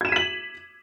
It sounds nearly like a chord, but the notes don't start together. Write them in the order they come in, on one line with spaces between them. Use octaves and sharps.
G#6 E7 D#7 B6 F#7